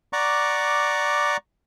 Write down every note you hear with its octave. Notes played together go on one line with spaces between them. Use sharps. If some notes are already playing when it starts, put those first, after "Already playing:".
D5 F#5 A#5 C#6 D6